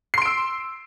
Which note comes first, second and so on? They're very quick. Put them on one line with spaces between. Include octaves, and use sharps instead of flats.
C7 C6 D7 E6